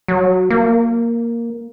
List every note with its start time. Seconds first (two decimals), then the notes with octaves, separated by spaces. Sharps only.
0.08 F#3
0.50 A#3